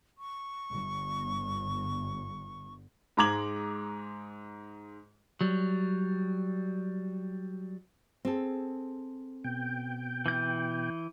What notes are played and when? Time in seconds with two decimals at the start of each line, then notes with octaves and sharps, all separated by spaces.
0.18 C#6
0.70 G1
3.17 G#2 G#3 A#5 D6 G#6 F#7
5.41 F#3 G3
8.25 C4 G#4 A4
9.44 B2 G5
10.26 E3 G6